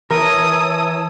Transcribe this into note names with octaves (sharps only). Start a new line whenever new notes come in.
E3 A#4 C#5 A5 D#6 E6